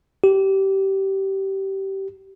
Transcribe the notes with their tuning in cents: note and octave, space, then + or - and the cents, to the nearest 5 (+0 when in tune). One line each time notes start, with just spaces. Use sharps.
G4 -20